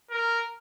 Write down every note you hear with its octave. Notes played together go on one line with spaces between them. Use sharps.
A#4